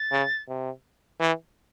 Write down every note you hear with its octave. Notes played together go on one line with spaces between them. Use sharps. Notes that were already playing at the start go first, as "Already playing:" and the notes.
Already playing: A6
C#3
C3
E3